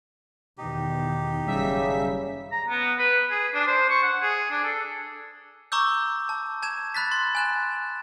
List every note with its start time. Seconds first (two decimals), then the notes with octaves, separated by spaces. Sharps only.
0.58 E2 B2 D#3 D#4 G4
1.47 F#1 C#3 G3 E5 B6
2.52 A#5
2.69 B3
2.99 B4
3.31 G#4
3.55 D4
3.67 C5
3.90 C#6
4.03 F#5
4.22 G#4
4.51 D4
4.64 A4
5.72 A#5 C#6 D6 E6 G6
6.29 A5
6.63 A5 G#6 E7
6.94 B5 F#6 A6 B6
7.11 C6 A6
7.35 G#5 F#6 E7